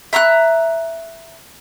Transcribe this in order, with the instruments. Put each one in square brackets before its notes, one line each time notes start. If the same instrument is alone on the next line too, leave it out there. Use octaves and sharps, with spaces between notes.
[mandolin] E5 A#5 C6 F#6